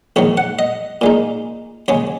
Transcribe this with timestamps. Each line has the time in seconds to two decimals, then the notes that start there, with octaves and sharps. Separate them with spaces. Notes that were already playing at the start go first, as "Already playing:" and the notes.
0.16 A#1 G#2 D#3 C#5
0.37 F#5
0.59 D#5
1.01 A#2 G#3 D#4
1.88 D#2 C#3 G#3 C#5